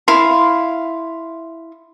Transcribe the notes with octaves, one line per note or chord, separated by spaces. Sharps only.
E4 F5 C6